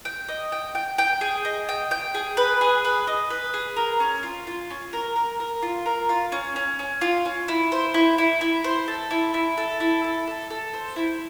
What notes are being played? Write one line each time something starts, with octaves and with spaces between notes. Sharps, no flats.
G5
D#5
G5
G5
G5
G#4
D#5
G5
G5
G#4
B4
G#4
B4
D#5
B4
G#4
A#4
C#4
F4
F4
C#4
A#4
A#4
A#4
F4
A#4
F4
C#4
C#4
C#4
F4
C#4
E4
C5
E4
E4
E4
C5
A4
E4
E4
A4
E4
A4
A4
A4
C5
E4